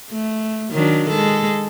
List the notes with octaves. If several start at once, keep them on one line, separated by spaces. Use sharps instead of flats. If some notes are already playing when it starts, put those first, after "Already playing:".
A3
D#3 F#3 D4
G#3 A4